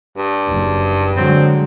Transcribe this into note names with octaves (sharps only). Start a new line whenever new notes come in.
G2
F#1
D3 F#3 G#3 C4